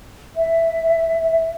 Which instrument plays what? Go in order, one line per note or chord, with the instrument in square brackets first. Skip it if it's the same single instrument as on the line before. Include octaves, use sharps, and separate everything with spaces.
[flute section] E5